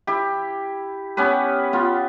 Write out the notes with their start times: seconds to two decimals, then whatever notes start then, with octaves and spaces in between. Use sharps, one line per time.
0.07 E4 G4
1.17 B3 C#4 G4 B4
1.73 B3 F4